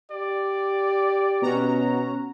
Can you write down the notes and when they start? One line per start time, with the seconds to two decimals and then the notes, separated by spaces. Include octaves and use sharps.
0.12 G4 D5
1.42 B2 C#4 F#4 A#5